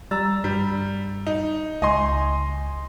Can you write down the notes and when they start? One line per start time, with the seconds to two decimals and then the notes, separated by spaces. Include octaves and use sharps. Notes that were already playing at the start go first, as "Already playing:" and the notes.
0.11 G3 A#5 E6 A6
0.44 G2 G3
1.27 D#4
1.82 C#2 D#5 G#5 C6